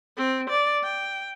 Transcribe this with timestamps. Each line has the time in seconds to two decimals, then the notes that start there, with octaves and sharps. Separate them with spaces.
0.17 C4
0.50 D5
0.83 G5